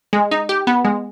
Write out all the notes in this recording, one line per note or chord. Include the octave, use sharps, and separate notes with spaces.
G#3
D#4
G4
B3
G#3